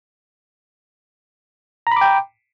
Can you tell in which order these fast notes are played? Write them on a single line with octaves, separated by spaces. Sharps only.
A#5 B5 D6 G5